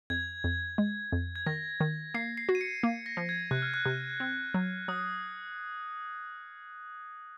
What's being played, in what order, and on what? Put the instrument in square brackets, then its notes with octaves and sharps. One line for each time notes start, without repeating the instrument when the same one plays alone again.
[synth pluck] F2 [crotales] G#6
[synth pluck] F2
G#3
F2
[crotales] G#6
[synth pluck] D#3 [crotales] A#6
[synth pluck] D#3
[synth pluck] A#3 [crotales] C7
[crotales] C7
[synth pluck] F#4
[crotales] D#7
C#7
[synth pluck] A#3
[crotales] A#6
[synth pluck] F3
[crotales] G#6
[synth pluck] C3 [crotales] F#6
[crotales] F6
F#6
[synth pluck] C3
C4
F#3
[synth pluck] F#3 [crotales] D#6